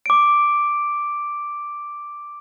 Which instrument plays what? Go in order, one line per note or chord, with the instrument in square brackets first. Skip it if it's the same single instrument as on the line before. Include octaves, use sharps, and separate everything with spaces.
[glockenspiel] D6 D7